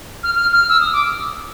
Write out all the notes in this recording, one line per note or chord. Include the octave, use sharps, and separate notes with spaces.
F6
F6
F6
E6
D#6
D6